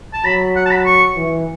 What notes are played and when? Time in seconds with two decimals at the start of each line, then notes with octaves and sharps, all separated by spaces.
0.13 A5
0.25 F#3 B5
0.56 F#5
0.66 A5
0.71 B5
0.86 C#6
1.16 E3